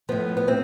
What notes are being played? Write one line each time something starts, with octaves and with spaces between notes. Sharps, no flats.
A2 F3 B3
B3
A2 C4